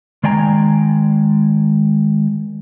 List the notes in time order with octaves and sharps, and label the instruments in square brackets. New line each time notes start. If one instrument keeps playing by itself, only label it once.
[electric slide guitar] D#3 G#3 D5 G5 G#5 A#5